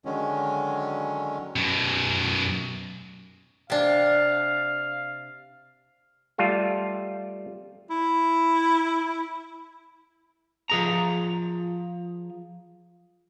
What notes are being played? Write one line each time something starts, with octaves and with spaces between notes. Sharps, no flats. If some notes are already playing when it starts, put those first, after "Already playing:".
D3 D#3 F#3 G#3 C#4
F#2 B2
C3 D4 F5
G3 A3 F4 A4
E4
F3 G#4 A#5